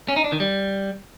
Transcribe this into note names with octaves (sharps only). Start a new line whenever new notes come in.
C#4
D#4
D4
D#3
G3